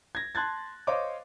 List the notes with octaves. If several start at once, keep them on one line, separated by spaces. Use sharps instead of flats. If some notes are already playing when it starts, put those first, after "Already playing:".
G#6 A#6
A5 C6 F#6 G#6 A6
C5 C#5 D#5 F5 C6 D6